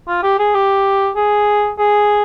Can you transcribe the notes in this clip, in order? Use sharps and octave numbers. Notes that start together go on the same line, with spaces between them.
F4
G4
G#4
G4
G#4
G#4